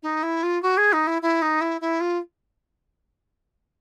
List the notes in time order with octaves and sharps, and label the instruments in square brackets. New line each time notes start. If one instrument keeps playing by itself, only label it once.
[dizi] D#4
E4
F4
F#4
G#4
D#4
E4
E4
D#4
E4
E4
F4